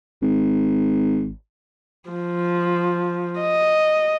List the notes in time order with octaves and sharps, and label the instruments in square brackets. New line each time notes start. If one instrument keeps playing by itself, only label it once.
[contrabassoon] G#1
[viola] F3
D#5